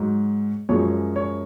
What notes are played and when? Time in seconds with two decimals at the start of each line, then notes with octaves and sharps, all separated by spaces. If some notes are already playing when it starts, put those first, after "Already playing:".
Already playing: G#2 F#3
0.69 F#2 F3 G#3 C#5
1.16 C#5